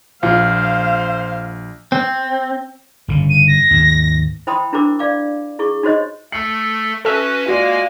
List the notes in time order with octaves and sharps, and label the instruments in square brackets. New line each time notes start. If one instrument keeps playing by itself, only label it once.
[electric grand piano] A#1 [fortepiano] F4 [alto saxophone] C5 [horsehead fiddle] F5
[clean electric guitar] C4
[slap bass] G1 C#3
[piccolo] D#7
A#6
[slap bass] D#2 G#2
[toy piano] E4 C5 G5 B5 C6 D#6
D4 E4 G4 A#4 C5 D6
D5 F5 D6
E4 G#4 C#6
D#4 F#4 G4 C5 C#5 D#5
[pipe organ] A3 A4 [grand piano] C7 C#7 F#7
[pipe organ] C#4 F#4 B4 [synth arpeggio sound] A4 E5
[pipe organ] G#3 A#3 G#5 [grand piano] F4 F#4 D5